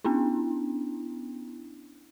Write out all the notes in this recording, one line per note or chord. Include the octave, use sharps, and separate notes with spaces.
B3 C#4 D4 E4